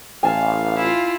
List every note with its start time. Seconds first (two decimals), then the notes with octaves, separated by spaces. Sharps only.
0.23 A1 F5 G#5 A5
0.77 E4 F4